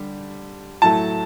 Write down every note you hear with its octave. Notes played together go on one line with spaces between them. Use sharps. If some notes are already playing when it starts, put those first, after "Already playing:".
Already playing: D3 G3
A2 F#3 A3 A5